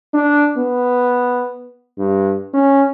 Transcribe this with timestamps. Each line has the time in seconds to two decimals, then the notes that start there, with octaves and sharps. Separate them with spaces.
0.14 D4
0.57 B3
1.98 G2
2.54 C#4